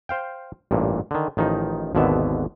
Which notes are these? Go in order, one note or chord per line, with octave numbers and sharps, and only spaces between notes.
C5 F5 G5
A1 G2 A#2
D3 D#3
A1 D#3 F3 D#4
G#1 D#2 B2 D3 B3 E5